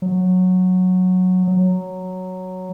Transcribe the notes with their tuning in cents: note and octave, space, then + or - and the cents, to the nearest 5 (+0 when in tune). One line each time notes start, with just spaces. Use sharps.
F#3 -10
F#3 +0